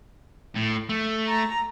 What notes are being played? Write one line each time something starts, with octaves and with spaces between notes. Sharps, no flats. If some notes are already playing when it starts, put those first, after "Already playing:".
A2
A3
A#5